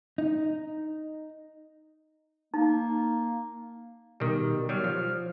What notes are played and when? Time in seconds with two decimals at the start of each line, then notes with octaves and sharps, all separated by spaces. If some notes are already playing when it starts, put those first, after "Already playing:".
0.18 D#4
2.54 A#3 D#4
4.20 B2 D#3 G3
4.69 F#3 G3 F6
4.84 F3